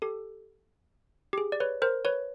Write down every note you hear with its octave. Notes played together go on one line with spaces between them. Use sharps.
G4 A4
G4
G#4
D5
B4 C#5
A#4 C5
B4 C#5